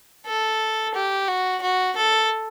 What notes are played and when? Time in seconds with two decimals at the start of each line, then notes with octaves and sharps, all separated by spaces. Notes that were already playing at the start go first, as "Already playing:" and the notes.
0.26 A4
0.94 G4
1.28 F#4
1.61 F#4
1.96 A4